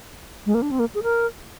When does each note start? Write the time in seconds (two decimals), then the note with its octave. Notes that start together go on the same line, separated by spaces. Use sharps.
0.46 G#3
0.55 A#3
0.62 D4
0.71 C4
0.79 A#3
0.95 G#4
1.03 A#4